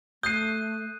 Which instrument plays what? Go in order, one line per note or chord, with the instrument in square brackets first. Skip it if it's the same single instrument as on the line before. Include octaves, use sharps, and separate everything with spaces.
[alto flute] A3 [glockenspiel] D#6 F#6 D#7 [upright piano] G6 C7